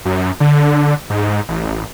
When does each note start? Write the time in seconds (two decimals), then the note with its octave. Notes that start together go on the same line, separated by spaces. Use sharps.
0.05 F#2
0.40 D3
1.10 G#2
1.49 A1